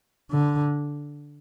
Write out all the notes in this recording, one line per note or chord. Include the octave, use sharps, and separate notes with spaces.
D3